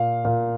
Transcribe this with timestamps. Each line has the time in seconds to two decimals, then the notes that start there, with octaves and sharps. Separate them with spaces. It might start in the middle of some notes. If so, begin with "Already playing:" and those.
Already playing: A#2 F5
0.25 A#2 F5